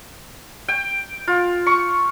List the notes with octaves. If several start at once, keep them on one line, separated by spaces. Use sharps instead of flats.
G5
F4
C#6